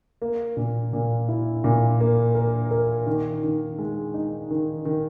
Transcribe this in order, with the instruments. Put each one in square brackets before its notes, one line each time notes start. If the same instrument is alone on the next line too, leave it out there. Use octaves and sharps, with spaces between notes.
[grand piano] A#3
A#2
A#2
E4
A#2
A#3
A#4
A#4
D#3
D#3
G#3
D#4
D#3
D#3